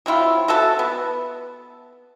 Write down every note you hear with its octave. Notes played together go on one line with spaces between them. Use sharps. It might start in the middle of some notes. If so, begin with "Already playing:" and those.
F#3 C4 E4 F4
F#4 A4 E5 A5
B3